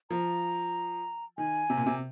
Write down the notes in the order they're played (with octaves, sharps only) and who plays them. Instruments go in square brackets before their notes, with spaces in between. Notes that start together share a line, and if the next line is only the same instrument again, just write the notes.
[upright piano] F3 [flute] A#5
[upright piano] D#3 [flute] G#5
[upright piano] C3
A#2
C3